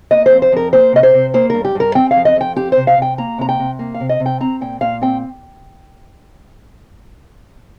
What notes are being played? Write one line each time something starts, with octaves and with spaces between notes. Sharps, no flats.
A#3 D#5
C5
F2
C5
F2 A#4
A#3 C5
C3 D#5
C5
C3
A#3 C5
G2 A#4
G4
G2 A#4
C4 G5
F5
F2
D#5
F2 G5
C4 G4
C3 C5
F5
C3 G5
A#3 A#5
C3 A#5
G5
C3
A#3
F5
C3
D#5
C3
G5
C4 A#5
A#2 G5
A#2 F5
C4 G5